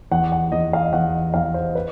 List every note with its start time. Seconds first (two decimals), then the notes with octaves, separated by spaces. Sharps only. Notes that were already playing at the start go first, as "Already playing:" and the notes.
0.11 E2 F#5
0.32 F#5
0.52 E2 D#5
0.73 F5
0.93 E2 F#5
1.34 E2 F5
1.54 C5
1.75 B4